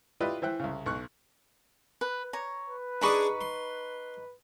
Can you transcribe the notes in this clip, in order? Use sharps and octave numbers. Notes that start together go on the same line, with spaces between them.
E4 F4 G4 B4 D5 D#5
E3 C5 E5 G5 F#6
C2 C#3
B1 C#6 F#6
B4
C#5 A#5
B4
D4 D#4 G#4 D5 B5 C#6
C6